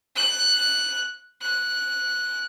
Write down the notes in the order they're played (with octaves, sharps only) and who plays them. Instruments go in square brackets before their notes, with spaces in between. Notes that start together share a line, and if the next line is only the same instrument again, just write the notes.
[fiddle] F#6
F#6